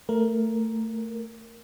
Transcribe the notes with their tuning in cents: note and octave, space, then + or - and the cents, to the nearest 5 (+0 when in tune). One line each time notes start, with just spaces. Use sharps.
A3 +20 A#4 +5